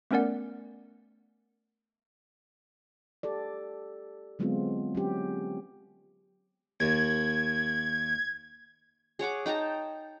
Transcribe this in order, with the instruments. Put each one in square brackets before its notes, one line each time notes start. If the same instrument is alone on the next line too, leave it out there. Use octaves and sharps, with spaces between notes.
[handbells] A3 B3 C#4 A#4 D5 F#5
[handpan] G4 A4 D5
D3 F#3 G#3 B3 C4 F4
F#3 C#4 G4
[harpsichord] D#2 [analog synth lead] G#6
[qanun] G#4 C#5 F#5 D6
D#4 G5 A5 A#5